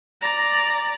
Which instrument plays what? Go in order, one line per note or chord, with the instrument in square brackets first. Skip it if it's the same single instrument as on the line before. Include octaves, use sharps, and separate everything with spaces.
[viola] D5 A#5